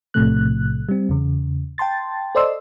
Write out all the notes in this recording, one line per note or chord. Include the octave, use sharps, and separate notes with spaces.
B1 A2 C3 F3 A3 F#6
G3 C4
E2 C#3
G5 A5 C6 A6
A4 C5 D5 D#5 C6 E6